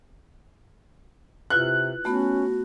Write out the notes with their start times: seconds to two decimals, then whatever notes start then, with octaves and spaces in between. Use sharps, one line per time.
1.50 C3 E4 F4 B4 F#6
2.05 A3 B3 C#4 F#4